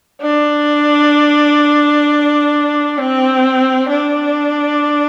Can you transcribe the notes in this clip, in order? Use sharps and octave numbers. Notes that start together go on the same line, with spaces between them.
D4
C4
D4